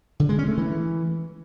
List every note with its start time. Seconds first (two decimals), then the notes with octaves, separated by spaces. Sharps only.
0.20 D3
0.29 G#3
0.39 C#4
0.48 A3
0.58 E3